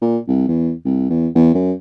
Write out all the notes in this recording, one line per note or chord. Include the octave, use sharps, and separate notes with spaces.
A#2
C2
E2
C2
E2
E2
F#2